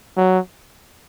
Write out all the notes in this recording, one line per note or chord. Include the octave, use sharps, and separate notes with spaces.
F#3